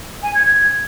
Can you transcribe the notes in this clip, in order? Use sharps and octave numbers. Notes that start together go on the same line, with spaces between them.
G#5
G#6
G#6